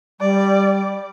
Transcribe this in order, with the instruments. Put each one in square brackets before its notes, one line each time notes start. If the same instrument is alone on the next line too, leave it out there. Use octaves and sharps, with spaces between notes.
[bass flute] G3 [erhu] D5